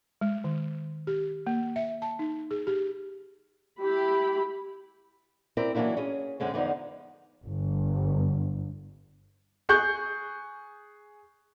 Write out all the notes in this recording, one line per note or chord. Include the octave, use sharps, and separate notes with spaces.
G#3
D#3
G4
A#3
E5
A5
D#4
G#4
G4
E4 G4 B5
C4 E4 A#4 D5
E3 F#3 G#3 A#3 D4 E4
C#4 G#4
F#2 D3 G#3 C4
E2 D3 F3 B3 D#4
G1
G#4 C#6 F#6 G6